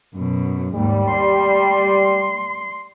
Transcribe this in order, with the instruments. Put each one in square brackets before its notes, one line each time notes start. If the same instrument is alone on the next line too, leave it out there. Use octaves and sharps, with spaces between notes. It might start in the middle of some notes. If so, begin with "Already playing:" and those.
[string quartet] F#2 B2
[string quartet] D#2 G#2 [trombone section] G3
[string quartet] C6